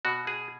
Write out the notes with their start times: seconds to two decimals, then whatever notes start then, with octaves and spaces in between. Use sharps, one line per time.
0.05 B2 F#4
0.27 G#4